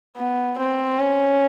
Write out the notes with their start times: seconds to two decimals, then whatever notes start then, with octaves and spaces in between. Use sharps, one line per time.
0.17 B3
0.58 C4
0.99 C#4